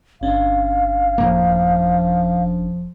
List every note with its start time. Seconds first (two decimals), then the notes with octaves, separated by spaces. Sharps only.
0.21 G1 C#4 D4 F5
1.18 F1 A2 F3 A#3